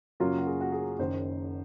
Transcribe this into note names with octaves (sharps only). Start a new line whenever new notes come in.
F#2 C#3 F#3 A#3 F4
F#4
G#4
F#4
G#4
F#1 F#2 D#3 C5